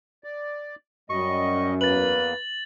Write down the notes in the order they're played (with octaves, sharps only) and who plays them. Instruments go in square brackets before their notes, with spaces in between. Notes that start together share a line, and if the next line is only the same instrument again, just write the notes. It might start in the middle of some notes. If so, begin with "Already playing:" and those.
[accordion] D5
[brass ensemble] F#2 [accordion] G3 D#5 [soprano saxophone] C#6
[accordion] E2 A#3 [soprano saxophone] B4 [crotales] A6 F#7